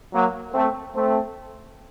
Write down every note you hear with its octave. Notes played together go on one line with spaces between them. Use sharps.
F#3 A#3
A3 C4
A3 C4